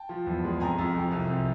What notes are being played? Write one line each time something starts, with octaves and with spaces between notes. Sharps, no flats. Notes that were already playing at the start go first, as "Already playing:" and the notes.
Already playing: G5 A5
F3
E2
G#3
F2 G#5 A#5
F2
F2
C2
C2